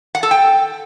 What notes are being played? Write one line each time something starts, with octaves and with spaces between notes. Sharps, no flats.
F#5
A4
G5